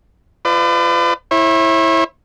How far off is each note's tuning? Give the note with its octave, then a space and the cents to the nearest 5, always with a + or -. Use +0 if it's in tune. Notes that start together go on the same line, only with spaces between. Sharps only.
F4 -20 B4 +40 D5 +25
E4 +0 C#5 -40